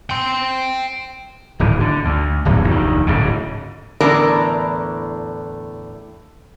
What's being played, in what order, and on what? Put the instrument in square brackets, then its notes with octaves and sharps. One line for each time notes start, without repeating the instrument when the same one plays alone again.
[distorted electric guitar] G5 C6
[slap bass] D1 G#1 E3
D3
D2
D1 G#1 E2 F#3
F1 D2 D#3
D1 G#2 C#3
[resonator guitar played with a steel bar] E2 A2 D3 A#4 D5 A5